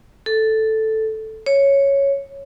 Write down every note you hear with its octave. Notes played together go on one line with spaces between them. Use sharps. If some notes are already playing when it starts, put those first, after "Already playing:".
A4
C#5